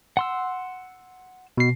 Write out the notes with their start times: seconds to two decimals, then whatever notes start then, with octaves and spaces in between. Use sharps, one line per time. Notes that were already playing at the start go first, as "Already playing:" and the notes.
0.17 F#5 C6 E6
1.58 B2 C7